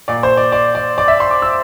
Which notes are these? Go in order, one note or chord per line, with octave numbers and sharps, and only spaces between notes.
A#2 D5
C5
D5
D5
D5
D5
E5
C6
D6
E6